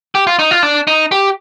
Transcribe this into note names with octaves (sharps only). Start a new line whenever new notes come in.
G4
F4
D#4
F4
D4
D#4
G4